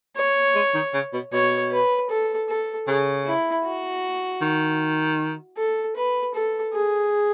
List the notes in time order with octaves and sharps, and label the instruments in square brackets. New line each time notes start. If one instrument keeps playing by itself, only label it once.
[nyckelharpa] C#5
[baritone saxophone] G#3
D#3
C#3
B2
[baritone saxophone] B2 [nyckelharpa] C#5
[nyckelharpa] B4
A4
A4
[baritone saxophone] C#3 [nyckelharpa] G#4
[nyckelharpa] E4
F#4
[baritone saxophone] D#3
[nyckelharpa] A4
B4
A4
G#4